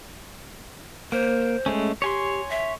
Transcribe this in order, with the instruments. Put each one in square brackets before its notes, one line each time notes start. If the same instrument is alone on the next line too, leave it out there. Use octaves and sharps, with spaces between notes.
[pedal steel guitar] A#3 [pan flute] C5
[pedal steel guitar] G#3 A3 C#4
[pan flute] G4 [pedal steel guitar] C#5 G#5 C6
[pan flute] E5